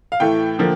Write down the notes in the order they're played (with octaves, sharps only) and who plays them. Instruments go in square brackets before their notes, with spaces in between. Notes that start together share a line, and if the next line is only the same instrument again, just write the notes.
[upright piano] F5
A2 E3 A3 G5
D3 F3 A#3